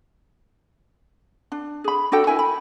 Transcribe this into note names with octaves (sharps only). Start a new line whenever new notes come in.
D4
G#4 B5
D4 F#4 A4 G5
E4 A#4 G#5
B5